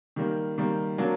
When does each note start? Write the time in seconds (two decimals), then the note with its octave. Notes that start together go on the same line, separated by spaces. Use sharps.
0.16 D#3 G3 A#3
0.58 D#3 G3 A#3
0.98 F#3 A#3 D4